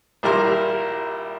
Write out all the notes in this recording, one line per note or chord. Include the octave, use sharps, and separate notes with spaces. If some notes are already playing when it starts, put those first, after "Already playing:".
A#1 G3 E4 A#4 A#5 C6